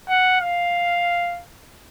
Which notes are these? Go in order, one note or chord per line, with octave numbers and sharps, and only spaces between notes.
F#5
F5